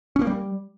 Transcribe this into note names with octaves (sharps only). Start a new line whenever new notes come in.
C#4
A#3
G3